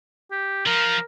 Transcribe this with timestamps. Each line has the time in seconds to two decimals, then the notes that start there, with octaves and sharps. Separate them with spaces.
0.31 G4
0.66 F3 A#4